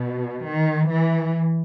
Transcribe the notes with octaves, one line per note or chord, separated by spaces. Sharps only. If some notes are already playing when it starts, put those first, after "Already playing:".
Already playing: B2
D#3
E3